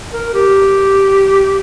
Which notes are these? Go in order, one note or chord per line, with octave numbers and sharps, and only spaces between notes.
A#4
G4